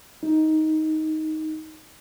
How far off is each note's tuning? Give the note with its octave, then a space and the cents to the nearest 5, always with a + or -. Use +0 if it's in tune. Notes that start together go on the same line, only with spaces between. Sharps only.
D#4 +10